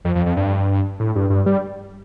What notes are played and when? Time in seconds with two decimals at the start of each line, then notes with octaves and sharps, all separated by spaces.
0.05 F2
0.16 F2
0.26 F2
0.37 G2
1.00 A2
1.15 G2
1.30 G2
1.46 G3